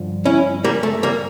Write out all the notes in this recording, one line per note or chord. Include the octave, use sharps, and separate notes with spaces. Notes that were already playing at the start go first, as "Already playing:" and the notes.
Already playing: G2 D3 F3
C#4 E4
G3 A#3
A3
G3 A#3